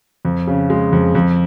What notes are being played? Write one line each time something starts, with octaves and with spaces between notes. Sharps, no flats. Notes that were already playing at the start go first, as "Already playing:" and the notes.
F2
C#3
G#3
F2
F2